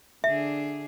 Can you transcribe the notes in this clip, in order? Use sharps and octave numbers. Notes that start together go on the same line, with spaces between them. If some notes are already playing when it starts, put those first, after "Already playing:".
D3 D4 G#4 E5